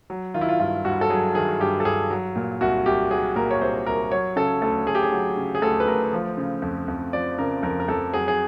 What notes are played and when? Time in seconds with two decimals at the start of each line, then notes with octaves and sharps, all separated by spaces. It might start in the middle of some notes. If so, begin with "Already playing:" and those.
0.10 F#3
0.34 D#3 F4
0.41 E4
0.49 F4
0.60 G2 F4
0.85 G2 F#4
1.01 A4
1.10 F#3 G#4
1.35 D#3 G#4
1.60 G2 G4
1.80 A4
1.85 G2 G#4
2.10 F#3
2.36 A#2
2.61 C2 F#4
2.86 C2 G4
3.11 F#3 G#4
3.36 A#2 A#4
3.51 C#5
3.61 C2 C5
3.86 C2 A#4
4.11 F#3 C#5
4.36 C#3 A4
4.62 D2 A4
4.87 D2 G#4
4.95 G4
5.03 G#4
5.12 F#3
5.37 C#3
5.55 G#4
5.62 D2 A4
5.80 B4
5.87 D2 A#4
6.13 F3
6.37 C#3
6.62 F2
6.88 F2
7.13 F3 D5
7.38 C#3 A#4
7.63 F2 A#4
7.80 A#4
7.88 F2 A4
8.14 F#3 G#4
8.28 G#4